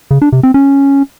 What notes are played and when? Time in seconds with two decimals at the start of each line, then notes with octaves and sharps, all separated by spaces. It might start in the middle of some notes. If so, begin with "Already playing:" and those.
0.11 C#3
0.22 D4
0.33 C3
0.43 C4
0.54 C#4